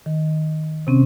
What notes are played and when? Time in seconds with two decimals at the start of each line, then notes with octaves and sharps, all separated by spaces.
0.06 D#3
0.87 C3 C4 C#4